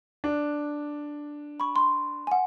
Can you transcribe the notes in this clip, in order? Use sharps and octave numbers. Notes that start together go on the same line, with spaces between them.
D4
B5 C#6
C6
F#5 G#5